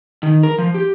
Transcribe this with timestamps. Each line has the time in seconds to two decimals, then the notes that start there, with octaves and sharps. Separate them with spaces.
0.23 D#3
0.43 A#4
0.58 F3
0.74 G4